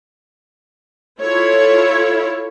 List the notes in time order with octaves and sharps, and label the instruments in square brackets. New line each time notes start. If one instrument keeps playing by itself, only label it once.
[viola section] E4 F4 A4 C#5